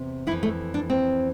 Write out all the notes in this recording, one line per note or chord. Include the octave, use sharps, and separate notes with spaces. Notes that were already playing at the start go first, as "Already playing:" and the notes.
Already playing: E2 C3
F2 E3 E4
A3
D4
C4